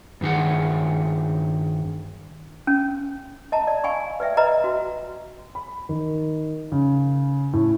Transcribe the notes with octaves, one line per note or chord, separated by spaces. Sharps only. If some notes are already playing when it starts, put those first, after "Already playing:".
G2 D#3 G#4 F#5
C#4
D#5 A5 A#5
D5
F5 G#5 B5 C#6
B4 D5 E5 G5
B4 D#5 A#5 B5
F#4
B5
D#3
C#3
A2